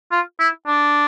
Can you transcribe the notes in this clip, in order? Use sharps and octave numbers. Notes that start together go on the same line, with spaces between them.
F4
E4
D4